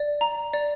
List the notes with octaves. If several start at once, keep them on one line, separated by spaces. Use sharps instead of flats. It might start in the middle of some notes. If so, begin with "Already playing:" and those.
Already playing: D5
A#5
D5